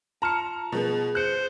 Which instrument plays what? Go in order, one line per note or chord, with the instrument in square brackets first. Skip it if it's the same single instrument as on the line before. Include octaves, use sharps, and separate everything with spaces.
[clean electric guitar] F4 A5 [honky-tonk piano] A#5 C#7
[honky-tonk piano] B2 F3 B3 [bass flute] G#4
[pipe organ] C5 [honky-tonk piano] F#6 C#7